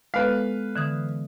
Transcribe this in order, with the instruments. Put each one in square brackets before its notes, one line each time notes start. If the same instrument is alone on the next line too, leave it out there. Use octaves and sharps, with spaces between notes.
[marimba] G#3 B3 A4 [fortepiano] B4 F5
[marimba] D3 E3 D#6